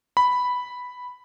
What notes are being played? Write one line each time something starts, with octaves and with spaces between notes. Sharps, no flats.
B5